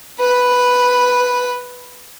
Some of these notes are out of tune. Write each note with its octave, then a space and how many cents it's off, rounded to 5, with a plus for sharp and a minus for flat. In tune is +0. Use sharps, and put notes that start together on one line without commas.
B4 +0 B5 +0